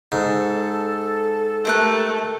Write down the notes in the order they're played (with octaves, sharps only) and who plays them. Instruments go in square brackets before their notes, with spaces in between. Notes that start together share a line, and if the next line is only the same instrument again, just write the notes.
[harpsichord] G#2 [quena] A4
[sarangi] A3 [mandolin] G4 A#4 F#6